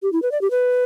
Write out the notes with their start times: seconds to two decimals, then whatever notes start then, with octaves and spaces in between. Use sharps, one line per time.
0.03 G4
0.13 E4
0.22 B4
0.32 D5
0.41 G4
0.51 B4